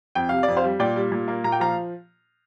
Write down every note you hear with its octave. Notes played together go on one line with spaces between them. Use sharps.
F2 G5
C3 F5
F2 D5
C5 F5
G3
A#2 D5 G5
G3
A#2
A#3
A#2 A#5
G5
F3 F5 A#5